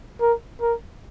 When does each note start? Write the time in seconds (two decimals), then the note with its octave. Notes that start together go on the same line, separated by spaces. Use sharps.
0.21 A#4
0.62 A#4